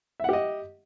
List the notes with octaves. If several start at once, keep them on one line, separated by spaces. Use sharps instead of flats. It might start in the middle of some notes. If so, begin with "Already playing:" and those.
G4 D#5 E5 F#5